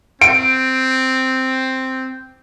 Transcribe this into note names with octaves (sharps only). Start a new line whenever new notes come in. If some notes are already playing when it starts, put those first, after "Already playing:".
C4 D7